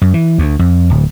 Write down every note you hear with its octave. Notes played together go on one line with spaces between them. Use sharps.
F#2
E3
D2
F2
D1